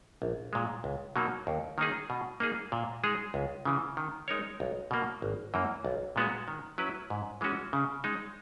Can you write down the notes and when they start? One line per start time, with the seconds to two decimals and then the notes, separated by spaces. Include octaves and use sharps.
0.22 A#1
0.53 A#2 G#3
0.84 C#2
1.16 B2 F#3 A#3 D#4
1.47 D#2
1.78 D#3 A#3 D#4 G#4
2.10 B2
2.40 A#3 D#4 G#4
2.72 A#2
3.03 G#3 D#4 G#4
3.34 C#2
3.65 C#3 E3
3.97 D#3
4.28 G#3 D#4 A#4 C#5
4.60 B1
4.91 B2 A#3
5.22 G#1
5.54 F#2 E3 A#3
5.85 B1
6.16 A#2 G#3 B3 F#4
6.48 D#3
6.78 F#3 C#4 E4 B4
7.10 G#2
7.41 E3 G#3 C#4 F#4
7.73 C#3
8.04 G#3 D#4